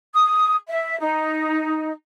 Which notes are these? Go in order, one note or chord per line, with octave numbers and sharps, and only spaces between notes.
D#6
E5
D#4